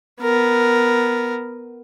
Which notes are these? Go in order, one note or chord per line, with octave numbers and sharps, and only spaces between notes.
B3 A#4